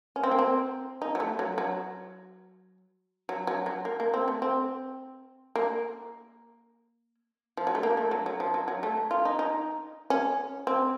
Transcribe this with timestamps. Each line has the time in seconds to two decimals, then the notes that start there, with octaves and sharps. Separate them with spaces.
0.16 C#4
0.23 C4
0.31 A#3
0.39 C4
1.02 D#4
1.15 F#3
1.20 A3
1.39 F#3
1.58 F#3
3.29 F#3
3.47 F#3
3.66 F#3
3.85 A#3
4.00 A#3
4.14 C4
4.28 A3
4.42 C4
5.56 A#3
7.57 F3
7.67 F#3
7.75 A3
7.83 A#3
7.97 A3
8.11 F#3
8.26 F#3
8.40 F3
8.54 F#3
8.68 F#3
8.83 A3
9.11 F4
9.25 D#4
9.39 D#4
10.10 C#4
10.67 C4